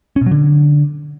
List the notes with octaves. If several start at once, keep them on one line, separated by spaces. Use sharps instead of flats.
C#4
B2
F#3
D3